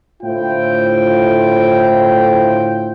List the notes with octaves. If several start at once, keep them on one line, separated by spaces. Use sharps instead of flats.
A2 D3 E4 F4 C5 G5